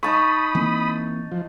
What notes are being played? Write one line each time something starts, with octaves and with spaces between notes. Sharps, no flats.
D#4 A5 B5 C#6 D#6
E3 A#3 C4
F3